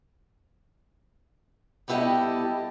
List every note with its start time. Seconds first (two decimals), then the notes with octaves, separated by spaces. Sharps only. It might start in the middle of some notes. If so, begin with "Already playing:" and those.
1.88 G3 B3 E4 G4 A4 D#5